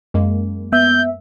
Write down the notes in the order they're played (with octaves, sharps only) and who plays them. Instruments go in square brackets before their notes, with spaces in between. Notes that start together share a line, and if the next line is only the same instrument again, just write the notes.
[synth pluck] F#2 G#3 A#3
[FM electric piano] B3 E5 [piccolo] G6